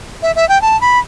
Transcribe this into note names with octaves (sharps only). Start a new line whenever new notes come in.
E5
E5
G5
A5
B5